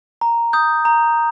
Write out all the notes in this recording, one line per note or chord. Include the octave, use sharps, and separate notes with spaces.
A#5
D#6 G6
A#5